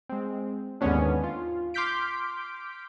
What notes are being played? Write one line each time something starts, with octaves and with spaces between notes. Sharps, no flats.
G#3 C4
D#2 G#2 D3 B3 C#4 D4
F4
C6 D6 F6 G6 B6 D7